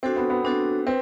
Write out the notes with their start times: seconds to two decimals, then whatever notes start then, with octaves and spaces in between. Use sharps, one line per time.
0.03 C4 D4 F#4 A4 C5
0.17 B3
0.30 B3
0.44 C4 D4 F#4 A4 C5
0.87 C4 B4